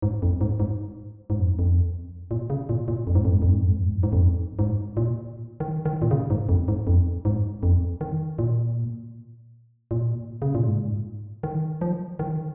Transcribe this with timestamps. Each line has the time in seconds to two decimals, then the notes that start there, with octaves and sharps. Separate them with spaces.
0.02 G#2
0.22 F2
0.41 G#2
0.60 G#2
1.30 G#2
1.40 F2
1.59 F2
2.31 A#2
2.50 C#3
2.69 A#2
2.88 A#2
3.07 F2
3.15 G#2
3.25 F2
3.33 G#2
3.42 F2
3.51 G#2
3.60 F2
3.68 G#2
3.77 F2
3.86 G#2
3.95 F2
4.03 G#2
4.12 F2
4.59 G#2
4.97 A#2
5.60 D#3
5.85 D#3
6.02 A#2
6.11 C#3
6.30 G#2
6.49 F2
6.68 G#2
6.87 F2
7.25 G#2
7.63 F2
8.01 D#3
8.39 A#2
9.91 A#2
10.42 C#3
10.55 A#2
10.67 G#2
11.43 D#3
11.81 F3
12.19 D#3